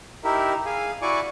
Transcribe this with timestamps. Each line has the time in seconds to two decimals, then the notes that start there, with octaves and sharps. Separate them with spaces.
0.24 D#4 E4 G4 A#4 E5
0.66 G#4 F5 G#5
1.02 E4 F#4 D5 G#5 C#6 D6